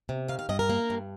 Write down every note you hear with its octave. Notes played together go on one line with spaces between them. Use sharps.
C3
D#3 F5
F5
G2 D#5
A#4
A#3
G2